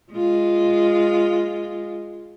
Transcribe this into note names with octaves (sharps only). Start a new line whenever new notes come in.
G#3 F4